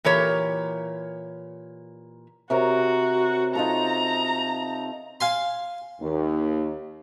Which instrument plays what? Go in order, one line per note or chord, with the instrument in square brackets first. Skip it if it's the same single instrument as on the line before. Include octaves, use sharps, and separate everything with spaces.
[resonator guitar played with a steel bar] A#2 E3 G4 A#4 C#5
[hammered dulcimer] C3 A#4 C#5 [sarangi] F#4
[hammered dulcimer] D#4 F4 A4 [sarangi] A#5
[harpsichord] F5 G#5 C6
[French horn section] D#2